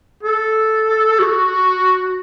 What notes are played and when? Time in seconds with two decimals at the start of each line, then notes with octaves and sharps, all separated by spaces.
0.23 A4
1.19 F#4